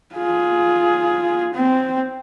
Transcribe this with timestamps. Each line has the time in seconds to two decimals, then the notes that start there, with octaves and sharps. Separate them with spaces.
0.14 F4 G#4
1.54 C4